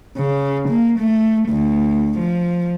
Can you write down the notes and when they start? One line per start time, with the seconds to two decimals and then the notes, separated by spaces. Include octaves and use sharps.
0.17 C#3
0.69 A#3
0.99 A3
1.49 D2
2.19 F3